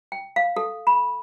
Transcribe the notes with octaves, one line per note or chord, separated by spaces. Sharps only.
G5
F5
A4
B5